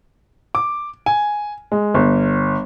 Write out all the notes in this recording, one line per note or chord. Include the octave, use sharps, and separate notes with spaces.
D6
G#5
G#3
G1